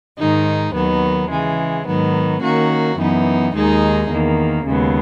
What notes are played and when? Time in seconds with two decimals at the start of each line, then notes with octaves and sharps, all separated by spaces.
0.18 G#2 D#3 G#3 D#4
0.74 D#2 D#3 F#3 B3
1.30 C#3 E3 G#3
1.85 G#2 D#3 F#3 B3
2.42 D#3 A#3 C#4 F#4
2.98 F#2 E3 B3 D#4
3.54 D#2 D#3 G#3 D#4 G#4
4.10 E2 D#3 A#3
4.66 D#2 C#3 G#3 B3